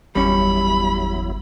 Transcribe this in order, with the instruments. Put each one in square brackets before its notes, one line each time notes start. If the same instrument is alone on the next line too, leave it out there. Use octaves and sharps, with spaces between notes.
[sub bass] G1 [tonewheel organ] E2 F#3 E4 [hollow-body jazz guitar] G3 C#4 [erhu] B5